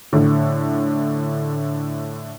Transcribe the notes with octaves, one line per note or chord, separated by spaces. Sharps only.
A2 D3